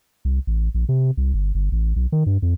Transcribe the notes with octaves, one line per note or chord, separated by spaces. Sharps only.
C2
A1
A#1
C3
C2
G1
G1
A1
B1
D#3
G2
F2